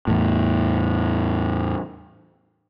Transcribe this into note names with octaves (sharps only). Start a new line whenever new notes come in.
E2 A2